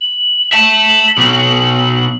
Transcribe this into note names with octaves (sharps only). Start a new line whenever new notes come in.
F#7
E5 A5
B1 B2